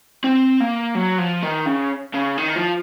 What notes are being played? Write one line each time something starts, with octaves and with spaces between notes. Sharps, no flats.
C4
A#3
F#3
F3
D#3
C#3
C#3
D#3
F3